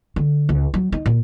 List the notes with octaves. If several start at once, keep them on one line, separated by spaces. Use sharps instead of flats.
D3
C#2
F#3
D#4
A#2